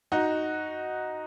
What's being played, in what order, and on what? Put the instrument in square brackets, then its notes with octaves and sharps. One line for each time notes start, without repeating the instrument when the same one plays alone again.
[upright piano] D#4 F#4